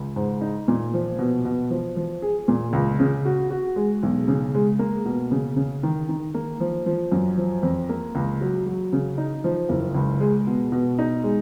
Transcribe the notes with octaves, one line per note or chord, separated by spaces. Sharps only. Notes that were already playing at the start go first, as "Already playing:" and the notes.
Already playing: C#2
G#2
D#4
A#2
F3
B2
B2
F3
F3
G#4
A#2
C#2
C#3
F#4
F#4
G#3
B1
C#3
G#3
A#3
B2
C#3
C#3
D#3
D#3
A#3
F3
F3
F#2
F3
F2
A#3
C#2
F#3
F#3
C#3
D#4
F3
F#1
C#2
G#3
B2
B2
D#4
G#3